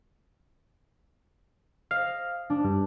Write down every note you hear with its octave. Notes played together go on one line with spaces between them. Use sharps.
D#5 F5
D4
G2